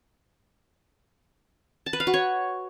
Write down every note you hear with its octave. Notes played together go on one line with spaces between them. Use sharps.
A5
B4
F5
F#4
C#5